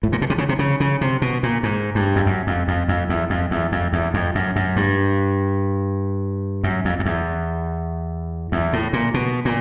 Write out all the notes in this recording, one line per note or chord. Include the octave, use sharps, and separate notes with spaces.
A2
A#2
B2
C3
C#3
C3
C#3
C#3
C3
B2
A#2
G#2
G2
F2
F#2
F2
F2
F2
E2
F2
E2
F2
E2
F2
F#2
F#2
G2
F#2
F2
F2
E2
E2
A2
A#2
B2
A#2